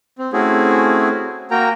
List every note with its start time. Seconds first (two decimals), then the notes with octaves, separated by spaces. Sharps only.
0.19 C4
0.33 A3 C4 C#4 E4 F#4 G#4
1.51 A#3 F#4 A#4 G5 A#5